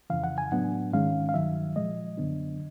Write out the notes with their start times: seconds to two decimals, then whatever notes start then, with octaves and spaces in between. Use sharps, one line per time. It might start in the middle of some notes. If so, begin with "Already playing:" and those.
0.10 F2 C#3 E3 F5
0.24 F#5
0.38 G#5
0.52 A2 F#3 B3 D4 F#5
0.93 G#2 D#3 G#3 C#4 F5
1.29 F5
1.34 G2 D#3 F#3 E5
1.76 A#2 F3 G#3 D#5
2.18 F#2 D3 F#3 B3 D4